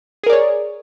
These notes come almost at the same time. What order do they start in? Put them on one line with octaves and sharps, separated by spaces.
G#4 A#4 D5 C#5